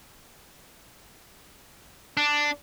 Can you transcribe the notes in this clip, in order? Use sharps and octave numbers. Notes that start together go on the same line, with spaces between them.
D4